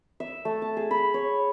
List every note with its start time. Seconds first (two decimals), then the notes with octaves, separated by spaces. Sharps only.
0.20 E5
0.45 A3
0.62 A5
0.77 G#4
0.91 B5
1.14 C#5